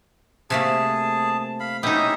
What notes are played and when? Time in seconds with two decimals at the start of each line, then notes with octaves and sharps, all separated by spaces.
0.50 C3 A3 A#3 G#4 A5
1.60 F5 B5
1.83 B2 C#4 D#4 E4 G4 E5 D#6